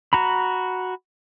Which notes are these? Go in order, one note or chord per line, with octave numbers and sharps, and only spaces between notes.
F#4 A#5 B5